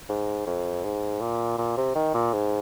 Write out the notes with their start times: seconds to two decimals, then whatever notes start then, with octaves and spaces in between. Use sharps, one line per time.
0.09 G#2
0.47 F2
0.84 G#2
1.21 A#2
1.58 A#2
1.77 C3
1.95 D#3
2.14 A#2
2.33 G#2